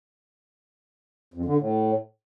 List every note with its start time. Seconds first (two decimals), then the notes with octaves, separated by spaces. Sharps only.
1.34 F2
1.45 D3
1.57 A2